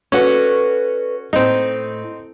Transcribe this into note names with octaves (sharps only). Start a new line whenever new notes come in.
C#4 F#4 A4 B4 D5
A2 C4 D#4